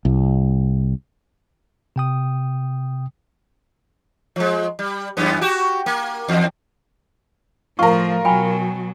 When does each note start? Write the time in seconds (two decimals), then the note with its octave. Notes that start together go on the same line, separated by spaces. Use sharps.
0.05 C2
1.96 C3 G5 D#6
4.36 F3 G#3
4.79 G3
5.17 F#2 E3 B3
5.41 F#4 G4
5.86 A#3
6.28 E2
7.79 A2 F3 F4 A#4 C#6
8.25 B2 F#3 G5 G#5 B5